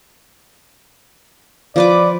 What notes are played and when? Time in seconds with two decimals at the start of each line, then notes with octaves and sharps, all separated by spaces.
1.76 F3 B4 D5 D6